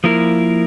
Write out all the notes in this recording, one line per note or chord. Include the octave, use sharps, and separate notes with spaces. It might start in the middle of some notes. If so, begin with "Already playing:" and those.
F3 A#3 E4 A#4